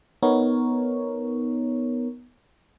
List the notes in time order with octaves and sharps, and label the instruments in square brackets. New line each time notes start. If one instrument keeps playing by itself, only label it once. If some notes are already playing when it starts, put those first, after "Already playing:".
[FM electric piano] B3 D#4 A#4 C#5